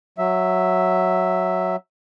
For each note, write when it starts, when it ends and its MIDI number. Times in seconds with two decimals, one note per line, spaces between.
0.18 1.76 54
0.18 1.76 76